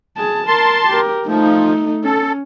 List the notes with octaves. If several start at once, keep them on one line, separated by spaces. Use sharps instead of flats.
G#4 A5
A#4 A5 C6
G4 A#4
F3 A3 D#4
C#4 A4